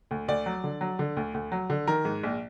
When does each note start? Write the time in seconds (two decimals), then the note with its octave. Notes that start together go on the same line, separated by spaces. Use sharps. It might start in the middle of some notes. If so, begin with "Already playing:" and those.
0.11 D2
0.28 D2 D5
0.46 F#3
0.64 D3
0.81 F#3
0.99 D3
1.17 D2
1.34 D2
1.52 F#3
1.70 D3
1.87 D#3 A#4
2.05 G#2
2.23 A#1